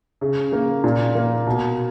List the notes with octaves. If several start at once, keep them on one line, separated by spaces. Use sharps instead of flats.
C#3
A#3
A#2
A#3
B2